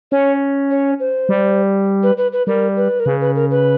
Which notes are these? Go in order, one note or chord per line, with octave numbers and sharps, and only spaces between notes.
C#4 C#5
C#5
C5
G3
B4
B4
B4
G3 A#4
B4
A#4
C#3 B4
B4
A#4
B4